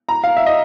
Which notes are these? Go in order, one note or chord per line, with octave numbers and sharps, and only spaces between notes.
A#5
F5
E5
D#5